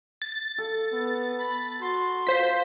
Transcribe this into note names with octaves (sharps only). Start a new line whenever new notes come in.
A6
A4
B3
B5
F#4 C6
F4 C5 B6